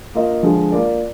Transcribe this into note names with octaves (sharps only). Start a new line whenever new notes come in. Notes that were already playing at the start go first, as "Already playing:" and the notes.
A#3 F4 A#4 D#5
D3 F3 G#3
A#3 F4 A#4 D5